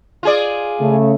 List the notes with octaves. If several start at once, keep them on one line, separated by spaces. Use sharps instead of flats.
F4 G#4 D5
C#3 A3